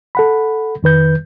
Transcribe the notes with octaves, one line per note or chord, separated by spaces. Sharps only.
A4 F#5 B5
F2 D#3 B4 G6